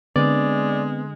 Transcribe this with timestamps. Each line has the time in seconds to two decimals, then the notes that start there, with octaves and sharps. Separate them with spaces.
0.16 D3 G#3 B3 C4 D5